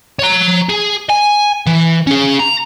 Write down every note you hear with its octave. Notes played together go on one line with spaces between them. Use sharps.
C#5 A#5
G#4
G#5
E3
C#4 G#4
A#5